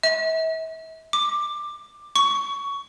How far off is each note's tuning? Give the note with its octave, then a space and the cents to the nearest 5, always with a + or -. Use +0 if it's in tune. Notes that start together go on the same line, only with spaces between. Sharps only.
E5 -40
D6 +15
C#6 +15